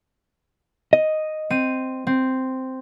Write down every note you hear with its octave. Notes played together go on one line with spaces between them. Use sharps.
D#5
C4 D#7
C4